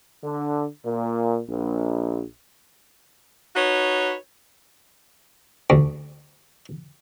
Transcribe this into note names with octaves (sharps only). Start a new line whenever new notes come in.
D3
A#2
A#1
D#4 F#4 B4 C#5
D2